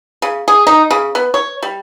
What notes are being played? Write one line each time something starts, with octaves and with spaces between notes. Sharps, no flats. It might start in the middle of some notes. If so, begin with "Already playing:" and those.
C#3
G#4
D#4
C#3
B3
C#5
G3